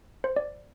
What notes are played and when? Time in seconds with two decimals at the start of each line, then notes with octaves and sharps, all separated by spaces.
0.24 C5
0.36 D5